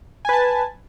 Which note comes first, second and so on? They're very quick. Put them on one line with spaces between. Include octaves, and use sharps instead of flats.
G#5 B4 A5